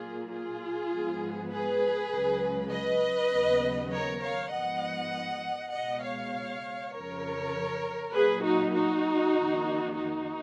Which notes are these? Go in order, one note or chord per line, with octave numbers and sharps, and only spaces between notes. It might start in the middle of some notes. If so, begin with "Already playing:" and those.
Already playing: A#2 F#3 A#3 F4 G#4
F4 G#4
G#2 F3 G#3 B3
G#4 B4
C#2 C#3 F#3
B4 D#5
D#2 C#3 F#3 B3
A#4 C#5
C#5 F5
G#2 F3 B3 D#5 F#5
C#2 B2 G#3 D#5 F#5
C#5 F5
F2 C#3 F3 A#4 C#5
A#2 F#3 A#3 G#4 B4
D#4 F#4
D#4 F#4
F2 D#3 A#3
D#4 F#4